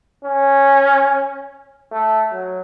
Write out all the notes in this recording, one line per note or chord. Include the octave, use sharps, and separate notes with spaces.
C#4
A3
F#3